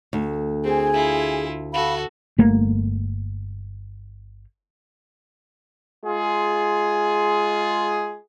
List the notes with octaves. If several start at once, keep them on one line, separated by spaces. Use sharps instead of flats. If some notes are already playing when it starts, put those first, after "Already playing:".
D2
C4 G#4 G#5
E4 F4
F#4 A4 F5 B5
G1 A3 A#3
G#3 F4 G#4